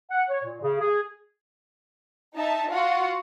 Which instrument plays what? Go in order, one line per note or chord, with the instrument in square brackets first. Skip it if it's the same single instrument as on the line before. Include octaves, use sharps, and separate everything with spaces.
[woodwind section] F#5
C#5
A#2
C#3
G#4
[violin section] D#4 E5 A5
F4 F#4 F#5